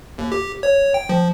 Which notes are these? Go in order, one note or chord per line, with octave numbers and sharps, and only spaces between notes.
D#2
G4
C#5
G5
F3